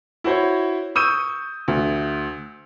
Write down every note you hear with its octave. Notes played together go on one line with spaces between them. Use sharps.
E4 F#4 C5 C#5
C#6 D#6 E6 G6 D#7
D2